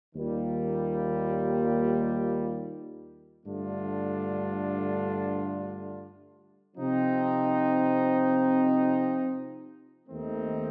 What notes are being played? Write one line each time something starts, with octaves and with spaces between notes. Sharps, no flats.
D#2 D#3 G3 A#3 F4
G2 D3 A3 D4 F4
C3 F3 C4 D#4
D#2 D#3 A3 C4 D#4